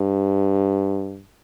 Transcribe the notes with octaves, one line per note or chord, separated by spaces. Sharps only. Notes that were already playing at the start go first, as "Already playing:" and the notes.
Already playing: G2